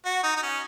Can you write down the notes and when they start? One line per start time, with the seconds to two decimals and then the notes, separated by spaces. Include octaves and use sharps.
0.05 F#4
0.24 D#4
0.36 D#4
0.43 C#4